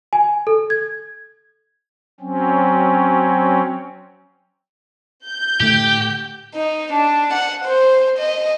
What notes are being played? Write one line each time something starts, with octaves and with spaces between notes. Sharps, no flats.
G#5
A4
G#6
F#3 C4 C#4
G6
A2 D3 A3 G4
D#4
D4
F#5
C5
D#5